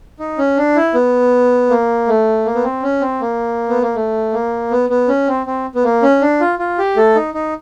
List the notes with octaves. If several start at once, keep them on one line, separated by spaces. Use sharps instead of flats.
D#4
C#4
D4
E4
B3
A#3
A3
A#3
B3
C4
C#4
C4
A#3
B3
A#3
A3
A#3
B3
B3
C#4
C4
C4
B3
A#3
C#4
D4
F4
F4
G4
A3 A4
D#4
D#4